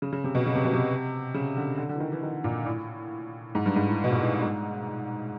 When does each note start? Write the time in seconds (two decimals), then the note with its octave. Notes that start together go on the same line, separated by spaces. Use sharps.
0.02 C#3
0.13 C#3
0.24 C3
0.35 B2
0.46 C#3
0.55 C3
0.65 B2
0.73 C3
1.34 C#3
1.57 D3
1.78 D3
1.89 D3
1.96 E3
2.00 D#3
2.12 E3
2.23 D#3
2.44 A#2
2.66 A2
3.55 G#2
3.66 G2
3.76 G#2
3.87 A2
4.04 B2
4.12 A#2
4.20 A2
4.42 G#2